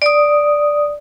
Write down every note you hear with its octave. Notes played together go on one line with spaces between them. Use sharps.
D5 D#6